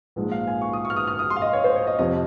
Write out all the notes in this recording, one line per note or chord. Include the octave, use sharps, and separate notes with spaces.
A#1 G#2 F3 G#3
F5
G#5
C#6
D#6
C#6
F6
D#6
F6
D#6
C6
F5
D#5
C#5
C5
C#5
D#5
F2 C3 F3 D#5